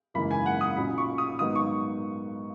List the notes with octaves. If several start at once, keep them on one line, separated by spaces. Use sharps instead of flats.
G#1 F#2 C#3 E3 A#3 B5
G#5
F#5
D#6
B1 A#2 F#3 C#4 B5
C#6
D#6
G#2 D#3 F#3 B3 D#6
C#6